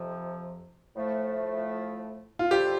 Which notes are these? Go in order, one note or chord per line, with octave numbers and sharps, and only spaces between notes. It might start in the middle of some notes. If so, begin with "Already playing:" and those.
Already playing: F2 C3 F3
A2 F3 A3
F4
F2 D3 G3 C4 F4 G4